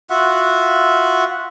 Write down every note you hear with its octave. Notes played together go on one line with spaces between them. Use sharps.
F4 F#4 E5 F#5